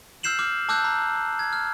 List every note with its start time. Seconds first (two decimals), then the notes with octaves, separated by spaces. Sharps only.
0.23 E6 F6 G6 C7 E7 F#7
0.39 D6 F6
0.69 A5 D6 E6 F#6 G6
0.84 A#5
1.39 G#6
1.53 F6